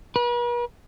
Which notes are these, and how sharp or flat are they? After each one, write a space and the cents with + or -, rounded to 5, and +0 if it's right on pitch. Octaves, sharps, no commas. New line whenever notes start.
B4 -45